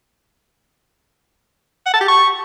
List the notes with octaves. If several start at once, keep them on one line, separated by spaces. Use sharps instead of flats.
F#5
A5
G4
C#6